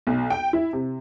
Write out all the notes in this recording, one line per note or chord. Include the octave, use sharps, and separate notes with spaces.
B1
G5
E4
C3